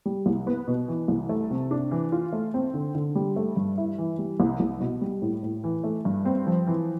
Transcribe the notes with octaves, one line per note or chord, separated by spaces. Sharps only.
G3
C2
B3
B2
E3
C2
A3
C3
D4
E3
F4
A3
C4
D3
D3
G3
A3
G2
E4
E3
G3
C2
C2
B2
G3
A2
A2
E3
A3
G2
C4
F3
E3